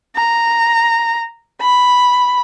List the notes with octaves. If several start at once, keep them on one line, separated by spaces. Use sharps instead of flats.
A#5
B5